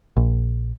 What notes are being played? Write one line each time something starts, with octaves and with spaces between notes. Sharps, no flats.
A#1